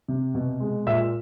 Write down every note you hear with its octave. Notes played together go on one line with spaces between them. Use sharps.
C3
B2
G#3
A#2 E5 E6